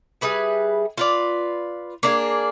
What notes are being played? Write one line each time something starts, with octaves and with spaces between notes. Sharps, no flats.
G3 G#4 B4 E5
F4 B4 D5
A#3 D4 G#4